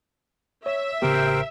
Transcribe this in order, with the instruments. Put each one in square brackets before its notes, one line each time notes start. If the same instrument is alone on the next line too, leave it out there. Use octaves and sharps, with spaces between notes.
[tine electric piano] C#5 [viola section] E5
[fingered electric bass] A1 C#3 B3 [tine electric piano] G4 [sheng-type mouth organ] A#4 C5 G5